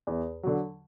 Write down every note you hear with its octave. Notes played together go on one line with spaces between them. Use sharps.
E2
D3 F#3